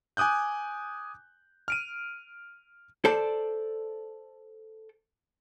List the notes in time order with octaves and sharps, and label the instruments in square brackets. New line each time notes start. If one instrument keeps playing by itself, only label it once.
[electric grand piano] G#5 D6 D#6 F#6 G6
F6 D7 D#7
[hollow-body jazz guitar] A4 C5 D5 A5